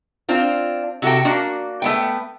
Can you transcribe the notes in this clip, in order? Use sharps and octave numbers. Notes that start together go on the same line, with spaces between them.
C4 D4 F4
C3 F#4 A4 G5
A#3 D4 F#4
A3 B3 G5